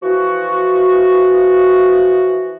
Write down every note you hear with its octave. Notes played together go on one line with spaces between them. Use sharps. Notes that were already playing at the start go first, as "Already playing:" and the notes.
E3 F3 F#4